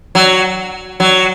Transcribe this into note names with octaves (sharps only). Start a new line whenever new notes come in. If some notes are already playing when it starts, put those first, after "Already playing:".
F#3
F#3